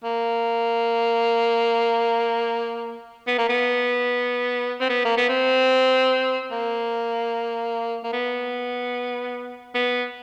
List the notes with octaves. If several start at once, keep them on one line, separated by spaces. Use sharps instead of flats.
A#3
B3
A#3
B3
C4
B3
A#3
B3
C4
A#3
A#3
B3
B3